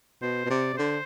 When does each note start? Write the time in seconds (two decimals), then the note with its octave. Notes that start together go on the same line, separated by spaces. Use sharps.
0.22 B2 C5
0.45 B2
0.49 C3 D5
0.73 C3
0.77 D3 C5